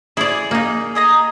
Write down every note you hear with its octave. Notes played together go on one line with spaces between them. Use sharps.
E4 G#4 D5
A#3 D#4
G#4 D#5 A#5